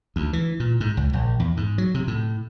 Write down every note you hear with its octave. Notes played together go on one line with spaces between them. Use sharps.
D2
E3
A#2
G#2
C#2
A#1
E2
G#2
F#3
C3
A2